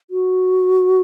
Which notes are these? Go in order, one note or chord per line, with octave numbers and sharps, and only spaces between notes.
F#4